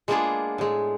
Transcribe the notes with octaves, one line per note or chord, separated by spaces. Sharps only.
G#3 A#3 B3 D4 F4 G#4
A2 G#3